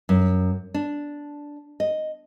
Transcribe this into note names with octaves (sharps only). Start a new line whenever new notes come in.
F#2
D4
D#5